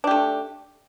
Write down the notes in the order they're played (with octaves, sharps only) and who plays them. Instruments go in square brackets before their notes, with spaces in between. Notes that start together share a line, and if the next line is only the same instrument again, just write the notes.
[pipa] D4
G4
A3